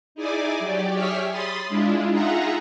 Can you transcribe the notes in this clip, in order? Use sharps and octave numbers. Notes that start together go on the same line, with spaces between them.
D#4 E4 G#4 D5 G#5 D6
F#3 G4 D5
G4 G#4 C#5 E5 F6 B6
B5 C6 D#6 A6
G#3 D4 E4 F4
D#4 F4 G#4 E5 F#5 A#5